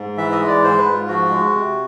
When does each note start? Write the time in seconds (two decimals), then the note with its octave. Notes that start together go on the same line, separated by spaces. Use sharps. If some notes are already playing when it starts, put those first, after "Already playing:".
Already playing: G#2
0.17 E3 E5
0.32 D#5
0.41 G#3
0.47 D5
0.62 G#2 C5
0.78 B4
0.86 G#2
0.94 F4
1.08 F3 F#4
1.31 G#3
1.54 C3